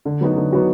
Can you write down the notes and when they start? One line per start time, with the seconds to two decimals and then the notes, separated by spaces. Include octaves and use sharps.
0.05 D3
0.21 F#3 B3 D#4 F#4
0.36 D3
0.52 F#3 B3 D#4 F#4